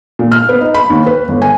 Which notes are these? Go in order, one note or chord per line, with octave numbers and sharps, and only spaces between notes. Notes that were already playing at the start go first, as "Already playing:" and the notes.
A#2
F6
B3
D#4
B5
D#2
B4
G1
G#5